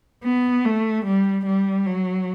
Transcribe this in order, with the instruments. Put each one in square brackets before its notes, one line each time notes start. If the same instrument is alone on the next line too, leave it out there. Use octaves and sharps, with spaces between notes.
[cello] B3
A3
G3
G3
F#3